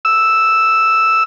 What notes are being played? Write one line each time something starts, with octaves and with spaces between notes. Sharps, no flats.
E6